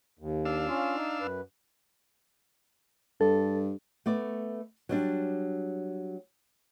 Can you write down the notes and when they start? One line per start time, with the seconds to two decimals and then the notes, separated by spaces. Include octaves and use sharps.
0.19 D#2
0.45 D4 F5 E6
0.68 C#4 F4
0.96 D#4
1.21 F#2 B4
3.21 G2 A4
4.06 A3 B3 D5
4.89 F#3 G3 D4